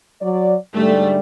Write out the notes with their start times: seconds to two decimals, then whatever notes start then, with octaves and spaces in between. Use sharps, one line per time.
0.21 F#3 D5
0.75 G#2 D3 G3 A3